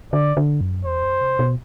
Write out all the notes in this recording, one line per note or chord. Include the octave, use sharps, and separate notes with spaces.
D3 D5
D3
F#2
E2 C5
F#2
C3
B2